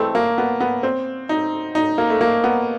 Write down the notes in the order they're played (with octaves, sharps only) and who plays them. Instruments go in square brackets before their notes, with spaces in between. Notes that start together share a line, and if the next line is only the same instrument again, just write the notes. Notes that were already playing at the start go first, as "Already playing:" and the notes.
Already playing: [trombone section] E3 G#3 C4 E4 A4 [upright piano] A3
[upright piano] A#3
B3
B3
C4
D#4
D#4
A#3
A3
A#3
B3